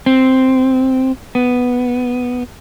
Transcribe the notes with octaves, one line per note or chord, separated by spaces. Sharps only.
C4
B3